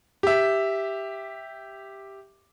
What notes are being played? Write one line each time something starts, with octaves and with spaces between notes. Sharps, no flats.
G4 E5